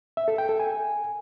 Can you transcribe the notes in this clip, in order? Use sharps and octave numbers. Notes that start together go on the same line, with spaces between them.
E5
A4
G5
A4
G#5